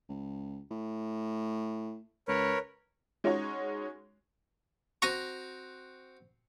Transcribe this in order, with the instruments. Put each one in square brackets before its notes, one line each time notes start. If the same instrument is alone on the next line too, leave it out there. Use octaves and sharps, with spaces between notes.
[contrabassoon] C#2
A2
[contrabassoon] C#2 [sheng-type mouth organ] A#4 B4 C#5
[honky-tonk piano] G#3 C#4 D#4 F#4 C#5
[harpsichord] C4 F#4 A#5 [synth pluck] C#6 A#6 D#7